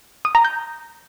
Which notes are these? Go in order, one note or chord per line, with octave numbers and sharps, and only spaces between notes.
D#6
A#5
G6